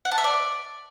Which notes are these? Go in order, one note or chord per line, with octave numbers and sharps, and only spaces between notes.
F#5
A5
E5
D5